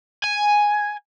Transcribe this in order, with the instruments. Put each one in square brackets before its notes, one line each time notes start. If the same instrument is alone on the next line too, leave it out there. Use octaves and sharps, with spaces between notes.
[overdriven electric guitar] G#5